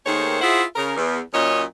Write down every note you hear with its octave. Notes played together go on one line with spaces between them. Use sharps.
D#2 D#3 A3 G#4 C5 C#5
E4 F4 G#4 C5 E5 F#5
C#3 A#4
E2
F#2 A#2 C#4 C#5 D#5